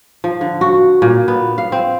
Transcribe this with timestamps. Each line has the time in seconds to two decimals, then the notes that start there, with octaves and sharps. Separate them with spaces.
0.24 F3
0.41 D3
0.61 F#4
1.02 A#2
1.28 B3
1.58 F5
1.72 C4